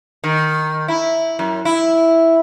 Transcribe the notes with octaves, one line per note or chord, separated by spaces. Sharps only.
D#3
E4
F#2
E4